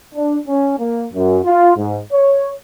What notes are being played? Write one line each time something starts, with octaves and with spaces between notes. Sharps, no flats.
D4
C#4
A#3
F#2
F4
G#2
C#5